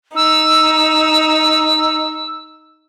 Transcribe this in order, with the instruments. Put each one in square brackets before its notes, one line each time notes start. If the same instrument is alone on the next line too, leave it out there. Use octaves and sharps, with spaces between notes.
[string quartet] D#4 [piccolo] E6